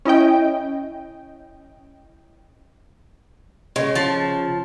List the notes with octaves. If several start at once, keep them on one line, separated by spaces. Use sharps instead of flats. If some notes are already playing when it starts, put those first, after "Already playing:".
C#4 E4 D#5 G5
C#3 G#3
F3 A5